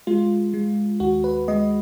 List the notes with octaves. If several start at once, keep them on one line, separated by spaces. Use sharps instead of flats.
G#3 F4
G#3
D#2 F#4
B4
G#3 D#5